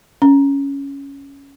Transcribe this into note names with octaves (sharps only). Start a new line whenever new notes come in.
C#4